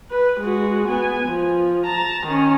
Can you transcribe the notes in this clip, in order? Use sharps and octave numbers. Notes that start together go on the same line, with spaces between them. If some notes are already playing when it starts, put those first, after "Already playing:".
B4
G#3 F#4
B3 G#5
F3
A5 A#5
D#3 C#4